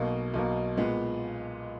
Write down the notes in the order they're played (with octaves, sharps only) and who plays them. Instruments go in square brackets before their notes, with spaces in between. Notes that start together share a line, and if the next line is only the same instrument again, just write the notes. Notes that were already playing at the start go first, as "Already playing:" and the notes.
Already playing: [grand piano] B1 B2 A#3
B1 B2 A#3
A#2 G#3 B3